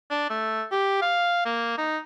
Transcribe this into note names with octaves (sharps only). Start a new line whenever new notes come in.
D4
A3
G4
F5
A#3
D#4